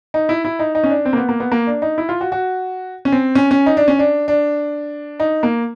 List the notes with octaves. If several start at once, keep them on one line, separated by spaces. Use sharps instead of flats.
D#4
E4
E4
D#4
D#4
C#4
D4
C4
A#3
B3
A#3
B3
A#3
D4
D#4
E4
F4
F#4
F#4
C#4
C4
C#4
C#4
D#4
D4
C#4
D4
D4
D#4
A#3